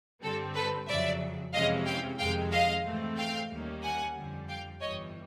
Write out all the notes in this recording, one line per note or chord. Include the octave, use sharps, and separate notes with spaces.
G2 D3 G3 C4 A4
A4 B4
F2 C#3 F#3 D5 E5
F2 C3 E3 G#3 C#4 D#5 F5
F5 G5
F2 C3 D#3 G#3 F5 G5
D#5 F5
G#2 E3 A3 C4
F5 G5
D#2 D#3 G3 A#3 C#4
F#5 G#5
F2 D3 G3
F5 G5
G1 G2 E3 G3 C#5 D#5